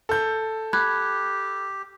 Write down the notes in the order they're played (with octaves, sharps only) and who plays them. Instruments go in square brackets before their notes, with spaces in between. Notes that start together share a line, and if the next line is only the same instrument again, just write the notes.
[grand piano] A4 G6
[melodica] G4 [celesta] B5 F#6 G#6